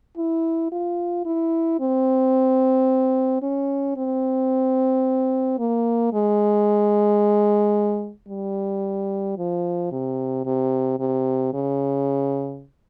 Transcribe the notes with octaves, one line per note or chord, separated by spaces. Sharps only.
E4
F4
E4
C4
C#4
C4
A#3
G#3
G3
F3
C3
C3
C3
C#3